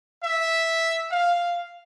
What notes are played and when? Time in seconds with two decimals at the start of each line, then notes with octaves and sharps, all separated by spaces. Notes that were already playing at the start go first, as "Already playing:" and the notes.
0.23 E5
1.11 F5